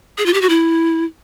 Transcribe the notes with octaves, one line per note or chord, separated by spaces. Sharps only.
G#4
F4
G4
F#4
E4